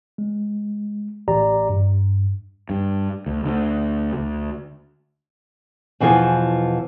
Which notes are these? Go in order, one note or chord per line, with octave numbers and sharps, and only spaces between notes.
G#3
A1 G4 D5 A#5
G2
G2
D2
D2
D2
E2 B2 E3 F3 C5 G#5